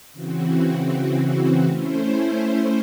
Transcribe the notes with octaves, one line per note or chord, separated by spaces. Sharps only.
C#3 E3 C4 F#4
A3 C#4 E4 C5